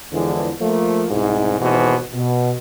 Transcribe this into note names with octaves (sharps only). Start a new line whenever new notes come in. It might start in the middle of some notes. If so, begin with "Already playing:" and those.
E2 D3 E3 F3 G#3 D4
F3 A3 A#3
C2 G#2 B2
G#1 D#2 B2 E3 G#4 C5
B2